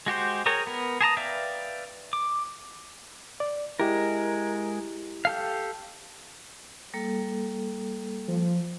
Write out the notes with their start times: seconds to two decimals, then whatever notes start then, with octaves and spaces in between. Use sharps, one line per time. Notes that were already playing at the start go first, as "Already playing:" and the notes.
0.06 G#3 F#4 G4 C5
0.46 G#4 A#4 C#5 G5 A#5
0.67 B3 A#4
1.01 G#4 A5 A#5 D#6
1.17 B4 D5 E5 F5 G5
2.13 D6
3.40 D5
3.80 G#3 E4 G4 A#4
5.25 G4 A4 F5
6.94 G3 A#3 A4
8.28 F3